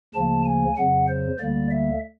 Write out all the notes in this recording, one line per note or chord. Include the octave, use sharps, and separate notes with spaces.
D2 C#3 F3 A#3 A5
G#5
F2 C#3 F#3 F#5
C5
D2 D3 G3 A#3 D5
E5